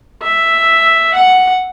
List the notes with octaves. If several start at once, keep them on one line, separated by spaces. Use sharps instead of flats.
E5
F#5